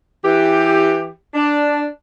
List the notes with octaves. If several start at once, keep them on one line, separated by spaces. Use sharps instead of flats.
E3 G4
D4